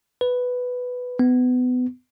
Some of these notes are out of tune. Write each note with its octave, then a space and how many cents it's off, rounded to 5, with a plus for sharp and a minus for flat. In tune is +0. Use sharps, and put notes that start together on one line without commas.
B4 +5
B3 +25